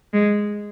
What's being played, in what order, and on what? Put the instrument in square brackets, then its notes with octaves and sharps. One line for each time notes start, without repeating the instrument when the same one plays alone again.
[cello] G#3